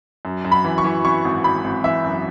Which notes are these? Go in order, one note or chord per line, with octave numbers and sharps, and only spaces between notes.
F#2
F#2
B5
E3
C#6
E3
E3 C#6
G#1
G#1 B5
G#1
E3 E5
F#2